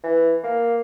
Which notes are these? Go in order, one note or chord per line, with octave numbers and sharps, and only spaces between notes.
E3
A#3